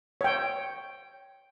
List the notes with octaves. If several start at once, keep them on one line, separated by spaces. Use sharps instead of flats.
C#5 G5